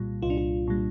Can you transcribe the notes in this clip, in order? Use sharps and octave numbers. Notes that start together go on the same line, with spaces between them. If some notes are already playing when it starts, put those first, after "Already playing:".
Already playing: C2 A#2 G3 F4
C2 F4
D4
F4
A#2 G3